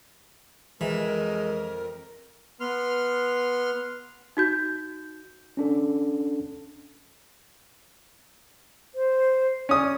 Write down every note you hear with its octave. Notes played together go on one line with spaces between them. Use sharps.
F2 E3 G#3 A#4
B3 C6 F6
D#4 F#4 G6
C#4 D4 A4
C5
C#4 D5 D#6